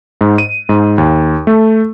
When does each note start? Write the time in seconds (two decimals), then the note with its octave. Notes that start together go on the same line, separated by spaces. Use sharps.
0.21 G#2
0.38 D#7
0.69 G#2
0.98 D#2
1.47 A3